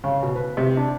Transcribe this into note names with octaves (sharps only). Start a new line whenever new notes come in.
C#3
B2
B4
C3
D4